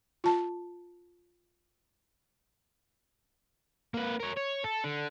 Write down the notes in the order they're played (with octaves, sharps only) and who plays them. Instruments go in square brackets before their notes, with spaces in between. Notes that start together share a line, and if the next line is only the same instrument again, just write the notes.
[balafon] F4 A5
[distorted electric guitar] A#3 B4
A#4 C#5
C#5
A4
D3